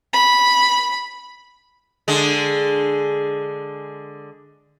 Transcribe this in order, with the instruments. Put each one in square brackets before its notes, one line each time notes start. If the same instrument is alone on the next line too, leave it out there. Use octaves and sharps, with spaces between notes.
[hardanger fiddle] B5
[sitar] D3 G#3